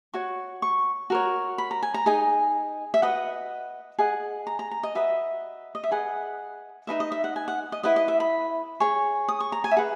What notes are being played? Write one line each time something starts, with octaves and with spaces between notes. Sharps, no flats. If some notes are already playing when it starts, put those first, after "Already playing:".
F#4 C#5 C#6
C#6
F#4 A#4 C#5
B5
A#5
G#5
A#5
D#4 G#4 D#5 G#5
E5
F#4 B4 D#5 F#5
G#4 D#5 F#5
A#5
A#5
A#5
D#5
F#4 B4 D#5 E5
D#5
E5
G#4 B4 D#5 F#5
D#4 F#4 B4 D#5 E5
D#5
E5
F#5
G#5
F#5
D#5
E4 B4 D#5 F#5
D#5
E5
B5
G#4 C#5 C#6
D#6
C#6
A#5
G#5
E5
G#4 B4 F#5